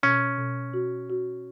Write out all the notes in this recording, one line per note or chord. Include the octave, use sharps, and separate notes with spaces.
B2 C#4
B2
F#4
F#4